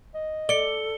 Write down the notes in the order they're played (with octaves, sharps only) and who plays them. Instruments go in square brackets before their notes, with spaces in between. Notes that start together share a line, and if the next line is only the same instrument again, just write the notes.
[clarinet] D#5
[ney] A4 [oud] D5 [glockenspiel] C#7 G7